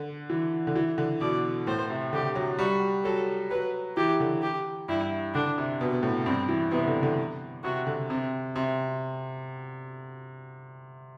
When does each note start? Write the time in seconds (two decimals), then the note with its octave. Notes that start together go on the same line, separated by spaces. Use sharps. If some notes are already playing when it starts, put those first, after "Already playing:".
Already playing: D3
0.30 E3
0.67 D3
0.76 E3
0.98 D3
1.21 B2 D5
1.67 A2 C5
1.90 C3
2.13 D3 G4
2.35 F#3
2.59 G3 F#4
3.05 F#3 A4
3.51 F#3 B4
3.97 E3 G4
4.20 D3
4.42 G4
4.88 G2 E4
5.34 D3 D4
5.58 C3
5.80 B2 B3
6.03 A2
6.26 G2 C4
6.49 E3
6.71 C3 B3
6.88 D3
7.03 D3
7.64 C3 F#4
7.87 D3
8.10 C3 C4
8.56 C3 C4